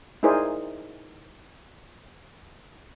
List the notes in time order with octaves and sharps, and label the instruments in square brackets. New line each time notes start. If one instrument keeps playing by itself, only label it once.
[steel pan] D#4 E4 G#4 A#4 C5 D5